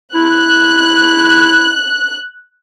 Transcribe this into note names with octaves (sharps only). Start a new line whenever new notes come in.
E4 F#6